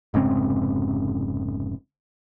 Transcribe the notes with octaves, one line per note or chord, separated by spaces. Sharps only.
F1 G#2 C#3 C4